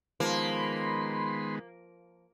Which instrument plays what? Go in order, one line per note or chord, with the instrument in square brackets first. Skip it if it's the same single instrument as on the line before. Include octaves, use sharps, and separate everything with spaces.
[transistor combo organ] D#3 G#3 B3 [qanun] F3 [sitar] A#3 [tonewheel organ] B5 C6